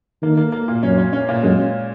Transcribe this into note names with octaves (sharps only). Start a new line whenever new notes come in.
D#3 A#3
A#3
A#3
A#2
F#2 C#4
C#4
C#4
A#2
F#2 G#3
C#4